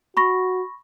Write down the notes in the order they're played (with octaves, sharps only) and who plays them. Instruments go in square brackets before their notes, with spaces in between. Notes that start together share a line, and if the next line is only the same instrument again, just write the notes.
[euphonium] F#4 [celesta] B5 C#6 A#6